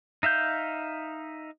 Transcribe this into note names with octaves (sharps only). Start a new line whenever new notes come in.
D#4 E5 F5 G6